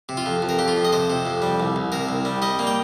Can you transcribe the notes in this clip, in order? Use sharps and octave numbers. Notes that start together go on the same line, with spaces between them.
C3
F4
F2
F2
A#4
F2 G4
F4
F2
D#5
C3 C5
C3
F2
G3
C2
C2
C3 A#4
C2
G3
G3 D#5
A#3
G5